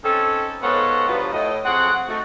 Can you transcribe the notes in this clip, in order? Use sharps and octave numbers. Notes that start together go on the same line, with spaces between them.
C4 C#4 D#4 A4
G#2 B3 F4 A4 C#5 F#5
G2 B2 F3 F#3 B3 F4
A2 D#5
F2 C4 F#4 G#4 F#5
A3 D#4 F#4